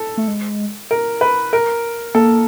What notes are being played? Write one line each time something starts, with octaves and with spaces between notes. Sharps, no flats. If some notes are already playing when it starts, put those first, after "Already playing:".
Already playing: A4
A3
G#3
A#4
B4
A#4
A#3 A4